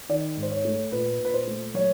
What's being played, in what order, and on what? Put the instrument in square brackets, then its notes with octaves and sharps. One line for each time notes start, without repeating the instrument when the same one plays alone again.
[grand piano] D#3 D5
G#2
C5
C#5
A3
A#2 B4
A#2
B4
C5
A3
F#3 C#5